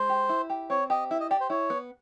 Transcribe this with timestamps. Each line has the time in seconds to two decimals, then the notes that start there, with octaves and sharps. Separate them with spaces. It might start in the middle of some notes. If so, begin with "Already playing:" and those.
Already playing: G#3 C5
0.09 G4
0.29 E4
0.50 G4
0.70 C4 C#5
0.90 G4 D#5
1.11 E4 E5
1.20 D#5
1.30 G4 D5
1.40 C5
1.50 E4 C#5
1.70 B3